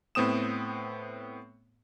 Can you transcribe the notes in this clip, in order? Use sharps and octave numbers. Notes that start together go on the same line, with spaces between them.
A2 B3 C4 D#6 E7